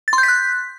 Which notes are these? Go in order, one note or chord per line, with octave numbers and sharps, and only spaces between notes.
A6
C6
G6
B6
F#6